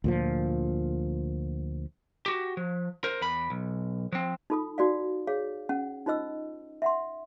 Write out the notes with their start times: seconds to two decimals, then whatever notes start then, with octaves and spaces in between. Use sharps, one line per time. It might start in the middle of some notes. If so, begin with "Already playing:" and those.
0.04 D2 A#2 F3
2.26 F#4 G4
2.57 F3
3.04 A#4 C5
3.21 E2 B5
3.50 B1
4.12 F3 C4
4.50 D#4 F4 A4 B5 D#6
4.78 D#4 F#4 D5 F5
5.27 G#4 C#5 F5
5.69 C#4 F#5
6.06 D#4 F4 C5 D#5 E6
6.82 E5 F#5 C6